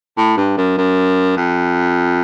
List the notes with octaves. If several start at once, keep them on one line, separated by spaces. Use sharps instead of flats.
A2
G2
F#2
F#2
F2